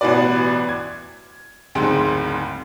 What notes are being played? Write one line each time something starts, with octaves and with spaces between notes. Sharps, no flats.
A1 B2 E3 F#4 B4 D5
G#6
F#1 D2 G#2 G#3 C4 C6